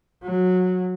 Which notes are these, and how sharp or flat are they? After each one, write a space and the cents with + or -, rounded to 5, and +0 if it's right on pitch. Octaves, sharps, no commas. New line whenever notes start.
F#3 -15